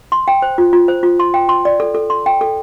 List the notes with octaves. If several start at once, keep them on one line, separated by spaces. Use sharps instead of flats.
C6
G5
C5
F4
F4
C5
F4
C6
G5
C6
D5
A4
A4
C6
G5
A4